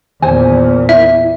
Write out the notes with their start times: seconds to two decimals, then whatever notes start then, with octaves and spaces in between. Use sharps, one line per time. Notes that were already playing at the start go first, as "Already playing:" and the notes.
0.22 E2 A#2 D#3 C5 G#5
0.89 E4 E5